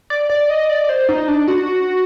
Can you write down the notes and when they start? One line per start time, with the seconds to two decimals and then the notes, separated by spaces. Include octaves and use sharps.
0.10 D5
0.30 D5
0.49 D#5
0.69 D5
0.89 C5
1.09 D#4
1.28 D4
1.48 F#4